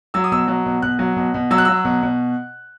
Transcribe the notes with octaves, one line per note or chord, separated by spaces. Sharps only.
F#3 E6
D#6
B2 E6
F#3
B2
B2 F#6
F#3
B2
B2
F#3 E6
F#6
F#3 E6
B2
B2